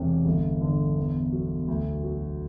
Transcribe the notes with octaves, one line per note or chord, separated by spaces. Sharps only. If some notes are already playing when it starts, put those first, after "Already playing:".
Already playing: E1 C3
G1
D3
E2
F#3
D2
F#3